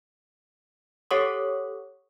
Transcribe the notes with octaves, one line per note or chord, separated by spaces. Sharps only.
G4 A4 C#5 F#5 C#6 D#6